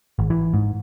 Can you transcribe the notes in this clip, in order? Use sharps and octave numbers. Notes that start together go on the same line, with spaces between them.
G#1
E3
G#2